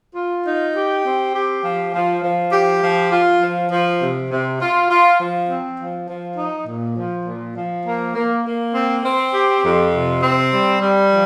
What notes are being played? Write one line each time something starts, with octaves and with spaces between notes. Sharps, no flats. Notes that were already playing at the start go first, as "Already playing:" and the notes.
F4
D#4
G4
C4
G4
F3
F3
F3
G4
F3
F4
F3
F3
C3
C3
F4
F4
F3
C4
F3
F3
D#4
A#2
F3
A#2
F3
A#3
A#3
A#3
C4
C4
G4
F2
C3
C4
G3
G3
F3